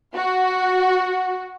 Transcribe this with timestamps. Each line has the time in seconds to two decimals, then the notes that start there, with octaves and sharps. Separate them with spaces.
0.15 F#4